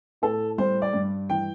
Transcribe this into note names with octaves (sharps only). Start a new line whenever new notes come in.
A2 A4
G3 C5
D5
G2
E3 G5